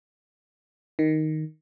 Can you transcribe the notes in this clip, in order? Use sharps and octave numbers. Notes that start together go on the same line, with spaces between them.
D#3